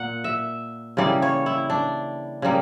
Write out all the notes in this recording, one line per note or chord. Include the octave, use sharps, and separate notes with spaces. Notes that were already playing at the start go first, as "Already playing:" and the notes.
Already playing: A#2 A#3 F#5
E5
C#3 E3 G3 A#3 D5
C#5
E4
D4
C#3 G3 A#3